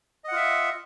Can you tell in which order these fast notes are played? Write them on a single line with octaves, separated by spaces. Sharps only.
D#5 F#5 F4 E5